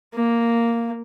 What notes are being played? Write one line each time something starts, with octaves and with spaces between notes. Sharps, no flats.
A#3